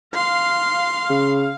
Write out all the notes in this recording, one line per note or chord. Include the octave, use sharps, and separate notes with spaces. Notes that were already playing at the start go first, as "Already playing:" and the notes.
F5 C6
C#3